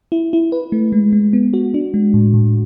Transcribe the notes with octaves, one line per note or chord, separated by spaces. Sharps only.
E4
E4
B4
A3
G#3
G#3
B3
F#4
D4
G#3
A2
A2